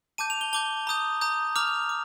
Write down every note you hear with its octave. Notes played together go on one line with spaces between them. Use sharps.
A5 D6 G6 D#7
F7
G7
A5 D6 G6 G7
A#5 D#6 G6
A#5 D#6 G6
A#5 D6 F6 F7
D6